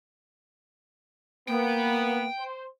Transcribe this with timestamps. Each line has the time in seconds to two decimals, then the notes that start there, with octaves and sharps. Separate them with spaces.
1.48 A#3 B3 G5
2.39 C5